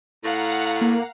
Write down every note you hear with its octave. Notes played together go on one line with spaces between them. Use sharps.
A2 F5 F#5 A#5
A#3